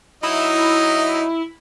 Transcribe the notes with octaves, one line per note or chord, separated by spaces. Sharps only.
F#3 D#4 E4 D#5